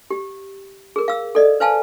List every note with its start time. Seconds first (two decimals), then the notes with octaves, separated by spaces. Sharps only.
0.10 G4
0.96 G#4 A#4
1.08 F5 E6
1.35 A4 D5 D#5
1.60 B4 C5 F5 G#5 A5